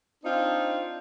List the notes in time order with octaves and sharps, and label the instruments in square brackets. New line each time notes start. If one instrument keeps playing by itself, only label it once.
[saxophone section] C4 D4 D#4 F4